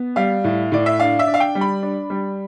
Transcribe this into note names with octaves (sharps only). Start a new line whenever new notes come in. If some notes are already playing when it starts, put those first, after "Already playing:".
Already playing: B3
G3 F5
A2
A2 D5
E5
D4 F5
E5
D4
F5
G5
G3
B5
D4
G3